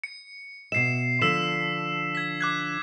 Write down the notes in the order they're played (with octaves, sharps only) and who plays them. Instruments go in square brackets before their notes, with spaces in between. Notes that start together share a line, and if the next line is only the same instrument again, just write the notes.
[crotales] C#7
[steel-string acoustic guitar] B2 E5 [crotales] C7 E7
[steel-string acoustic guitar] D3 F3 [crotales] E6 B6 E7
[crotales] G#6 B6
D6 F#6 G#6